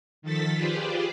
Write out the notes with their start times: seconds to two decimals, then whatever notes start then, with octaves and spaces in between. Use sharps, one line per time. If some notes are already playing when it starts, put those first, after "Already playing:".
0.22 D#3 F3 A4 A6 B6
0.55 F4 G4 G#4 B4 C5 D5